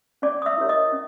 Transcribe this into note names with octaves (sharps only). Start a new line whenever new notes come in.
C#4 D5 D6
D#6
E5 E6
E4 G4 A#4 C#5
D#5 D#6
C#4